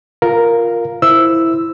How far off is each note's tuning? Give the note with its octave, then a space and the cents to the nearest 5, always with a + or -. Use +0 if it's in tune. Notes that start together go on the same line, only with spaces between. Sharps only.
F4 +0 A#4 +0 F5 +0
E4 +0 C5 +0 E6 +0